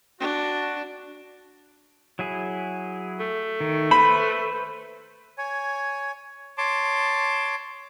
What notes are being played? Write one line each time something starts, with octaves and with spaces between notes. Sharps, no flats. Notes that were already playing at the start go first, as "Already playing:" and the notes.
D4 F#4
F#3 E4 G#4
A3
D#3
B4 C5 B5
C#5 G#5
C#5 A5 C6 D6